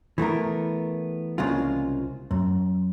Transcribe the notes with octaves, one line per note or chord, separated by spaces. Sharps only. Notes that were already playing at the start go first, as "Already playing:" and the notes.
E3 A3 B3 A#4
C2 C#3 G#3 A#3 F4
F#2